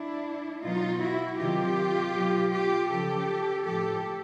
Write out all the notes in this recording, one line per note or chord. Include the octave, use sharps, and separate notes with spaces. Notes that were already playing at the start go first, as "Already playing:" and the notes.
Already playing: D4 E4
B2 F#3 D#4 F4
E4 F#4
C3 D#3 F#3 F4 G4
B2 F#3
F4 G4
C#3 F3 G4 A4
A2 F3 G4 A4